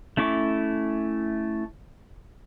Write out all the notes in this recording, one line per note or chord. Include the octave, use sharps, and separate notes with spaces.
A3 C#4 E4 C#6 D6